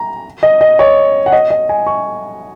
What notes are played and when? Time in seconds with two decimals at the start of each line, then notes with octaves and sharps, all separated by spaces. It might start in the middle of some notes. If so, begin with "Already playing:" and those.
Already playing: A#5
0.43 D#5
0.61 D#5
0.79 C#5
1.26 F#5
1.32 D#5
1.50 D#5
1.69 G#5
1.87 C#6